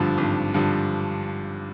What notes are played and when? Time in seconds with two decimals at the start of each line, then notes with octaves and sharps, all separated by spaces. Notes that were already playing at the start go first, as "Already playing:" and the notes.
Already playing: G#1 G2 D3 F3
0.18 G#1
0.54 G2 D3 F3